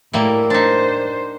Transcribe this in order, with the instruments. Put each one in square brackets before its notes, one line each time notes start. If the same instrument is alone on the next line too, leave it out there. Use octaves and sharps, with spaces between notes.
[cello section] A2 [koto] G3 A#3 E4
[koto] D4 D#4 [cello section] C5